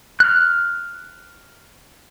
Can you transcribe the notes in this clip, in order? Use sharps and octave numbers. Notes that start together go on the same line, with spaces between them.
F6 F#6